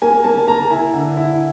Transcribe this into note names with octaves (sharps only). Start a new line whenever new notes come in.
A#3 G#5
A#3 A5
A#3 A#5
E4 G#5
D3
E4